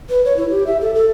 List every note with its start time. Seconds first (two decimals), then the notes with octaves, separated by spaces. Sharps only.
0.09 B4
0.25 C#5
0.37 E4
0.50 G4
0.67 E5
0.81 A4
0.95 A4